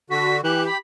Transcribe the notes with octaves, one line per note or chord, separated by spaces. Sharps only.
D3 F#4 B6
E3 G4 F#6
B5